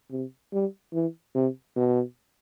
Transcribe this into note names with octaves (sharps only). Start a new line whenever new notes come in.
C3
G3
E3
C3
B2